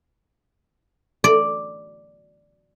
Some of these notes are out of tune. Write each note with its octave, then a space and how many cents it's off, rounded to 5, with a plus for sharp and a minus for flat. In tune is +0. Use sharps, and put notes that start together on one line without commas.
D5 +0